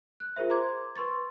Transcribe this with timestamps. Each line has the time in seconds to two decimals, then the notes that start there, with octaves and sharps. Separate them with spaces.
0.20 F#6
0.36 F4 G#4 A#4 C5 E5
0.50 C5 A#5 C6 D6 G#6
0.96 B4 C6 C#6 A6